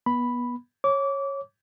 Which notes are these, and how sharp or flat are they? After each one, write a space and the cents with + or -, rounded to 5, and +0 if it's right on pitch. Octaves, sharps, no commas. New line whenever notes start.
B3 -25 B5 +0
C#5 -15 D6 -25